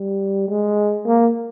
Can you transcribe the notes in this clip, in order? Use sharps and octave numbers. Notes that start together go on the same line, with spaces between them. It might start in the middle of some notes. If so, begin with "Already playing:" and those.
Already playing: G3
G#3
A#3